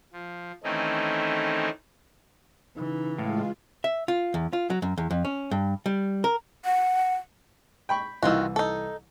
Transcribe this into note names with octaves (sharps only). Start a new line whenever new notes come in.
F3
D#3 E3 A3 C4 C#4 D#4
C#3 E3 D#4
A2 G#3 F4 F5
E5
F4
E2
F4
F#3
F#2
E2
F2
C#4
G2
G3
A#4
F#5
G5 B5 C#6
C2 D#3 E3 F4 F#4 E6
D#4 A4